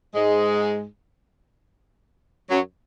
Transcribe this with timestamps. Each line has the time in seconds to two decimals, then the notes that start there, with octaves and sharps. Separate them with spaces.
0.14 G#2 G#3
2.50 F#2 F#3